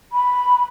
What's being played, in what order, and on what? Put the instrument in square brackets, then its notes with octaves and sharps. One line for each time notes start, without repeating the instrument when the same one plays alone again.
[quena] B5